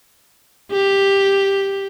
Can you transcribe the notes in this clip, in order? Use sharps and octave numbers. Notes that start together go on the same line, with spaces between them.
G4